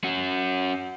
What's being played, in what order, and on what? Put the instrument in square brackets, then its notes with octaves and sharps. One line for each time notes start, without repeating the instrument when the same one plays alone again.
[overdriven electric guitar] C#4 F#4